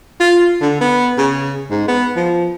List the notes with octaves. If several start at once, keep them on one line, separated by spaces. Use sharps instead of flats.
F4
D3
B3
C#3
G#2
B3
F3